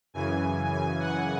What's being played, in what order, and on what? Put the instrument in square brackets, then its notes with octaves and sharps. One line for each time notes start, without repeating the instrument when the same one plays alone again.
[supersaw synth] F#2 C#3 E3 G#5
G#5
F#5